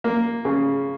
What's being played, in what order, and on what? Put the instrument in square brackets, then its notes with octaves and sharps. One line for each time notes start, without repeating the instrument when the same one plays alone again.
[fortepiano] A#3
C#3